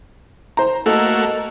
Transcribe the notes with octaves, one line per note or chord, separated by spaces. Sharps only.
C5 A#5
A3 A#3 F#4 A4 D#5